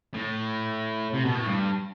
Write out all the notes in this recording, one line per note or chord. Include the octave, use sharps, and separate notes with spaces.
A2
C3
B2
A2
G2